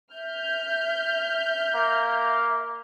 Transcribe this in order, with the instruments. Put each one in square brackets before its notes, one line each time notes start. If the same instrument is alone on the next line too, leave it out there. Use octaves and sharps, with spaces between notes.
[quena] E5 [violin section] F6 G6
[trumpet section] A#3